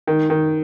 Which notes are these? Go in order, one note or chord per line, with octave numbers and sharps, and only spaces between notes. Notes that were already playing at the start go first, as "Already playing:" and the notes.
D#3
D#3